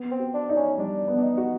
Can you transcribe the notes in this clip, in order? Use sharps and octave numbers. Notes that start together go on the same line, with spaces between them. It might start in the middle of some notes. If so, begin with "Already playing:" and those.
Already playing: B3
C4
F#4
D4
D#4
C#4
G3 D4
B3
D4
D#4
F#4